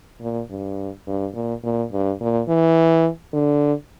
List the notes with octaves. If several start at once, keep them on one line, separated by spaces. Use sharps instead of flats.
A#2
G2
G2
A#2
A#2
G2
A#2
E3
D3